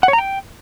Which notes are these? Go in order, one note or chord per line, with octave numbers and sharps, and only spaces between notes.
F#5
C#5
A#5
G5